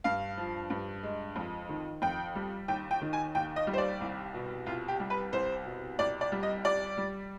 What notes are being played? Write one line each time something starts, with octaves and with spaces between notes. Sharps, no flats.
G2 F5
F3
G2
G#3
F2
D#3
F2 G5
G3
D#2 G5
G5
D#3
G#5
D#2 G5
D#5
G3
C5
D5
C2
B2
C2 F4
G4
G3
B4
C2 C5
B2
C2 D5
D5
G3
D#5
G3 D5
G3